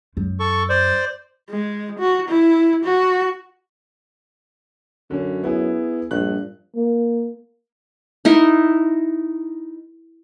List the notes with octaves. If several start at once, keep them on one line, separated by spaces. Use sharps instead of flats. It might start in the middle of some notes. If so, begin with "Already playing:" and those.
F#2
A4 C#6
C5 D5
G#3
F#4
E4
F#4
F#2 D3 C#4
B3 E4 G#4
A#1 G2 F#6
A#3
D#4 E4 A#4